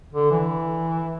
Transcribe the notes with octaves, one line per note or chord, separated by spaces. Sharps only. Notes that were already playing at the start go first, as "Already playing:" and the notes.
D3
E3